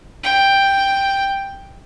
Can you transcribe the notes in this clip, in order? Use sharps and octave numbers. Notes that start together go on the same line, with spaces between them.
G5